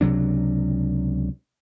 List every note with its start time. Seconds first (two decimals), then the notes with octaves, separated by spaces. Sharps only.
0.01 C#2 C3 F#3 D4